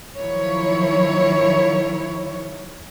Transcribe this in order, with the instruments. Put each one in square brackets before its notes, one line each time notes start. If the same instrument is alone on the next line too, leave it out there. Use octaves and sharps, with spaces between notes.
[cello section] D#3 F3 F#3 E4 C#5